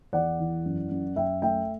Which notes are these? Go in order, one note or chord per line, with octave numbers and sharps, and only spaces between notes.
E2 D5 F#5
E3
F#2
F#2
F#2 E5 G5
A3 E5 G5